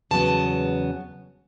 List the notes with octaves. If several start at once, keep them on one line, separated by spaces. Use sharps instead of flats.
E2 C#3 F#3 B3 A5